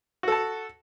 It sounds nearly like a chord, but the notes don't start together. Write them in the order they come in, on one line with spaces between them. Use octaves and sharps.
F#4 A4 A5